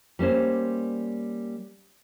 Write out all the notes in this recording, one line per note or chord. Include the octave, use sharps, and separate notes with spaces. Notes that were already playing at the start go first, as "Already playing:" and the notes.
G3 A#3 C#4 C5